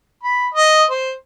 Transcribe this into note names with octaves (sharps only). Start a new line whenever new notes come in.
B5
D#5
C5